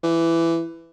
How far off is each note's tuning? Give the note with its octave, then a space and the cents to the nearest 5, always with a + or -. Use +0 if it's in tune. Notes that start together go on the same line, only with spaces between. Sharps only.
E3 +15